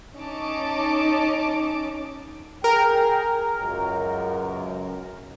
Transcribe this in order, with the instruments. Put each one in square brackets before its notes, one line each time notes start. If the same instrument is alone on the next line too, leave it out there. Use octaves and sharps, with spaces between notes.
[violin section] C#4 D#4 A5 D6
[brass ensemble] G#4 G5 [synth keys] A#4
[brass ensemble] C#2 F#2